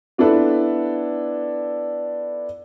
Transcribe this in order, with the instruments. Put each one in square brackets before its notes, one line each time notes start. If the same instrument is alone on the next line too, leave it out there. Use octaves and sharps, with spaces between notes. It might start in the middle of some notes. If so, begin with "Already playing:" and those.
[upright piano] B3 D4 E4 F4 A4 B4